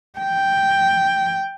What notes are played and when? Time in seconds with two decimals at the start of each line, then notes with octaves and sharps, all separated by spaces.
0.19 G5